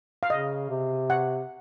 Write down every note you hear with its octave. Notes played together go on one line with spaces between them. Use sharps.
F5
C#3 D#5
C3
F#5